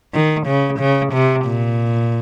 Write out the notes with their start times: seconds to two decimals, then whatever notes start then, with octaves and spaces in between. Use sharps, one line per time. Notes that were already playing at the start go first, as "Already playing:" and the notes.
0.14 D#3
0.47 C#3
0.79 C#3
1.13 C3
1.46 A#2